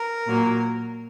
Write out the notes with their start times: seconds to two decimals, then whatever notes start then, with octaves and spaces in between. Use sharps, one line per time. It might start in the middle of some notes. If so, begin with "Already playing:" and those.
Already playing: A#4
0.27 A#2 F#3 A#3